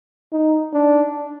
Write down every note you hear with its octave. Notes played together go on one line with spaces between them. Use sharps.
D#4
D4